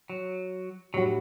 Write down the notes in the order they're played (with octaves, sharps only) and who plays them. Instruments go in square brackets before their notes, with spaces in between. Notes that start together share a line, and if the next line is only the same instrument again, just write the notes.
[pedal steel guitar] F#3
[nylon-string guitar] A2 G3 D4 F#4 [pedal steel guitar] F#3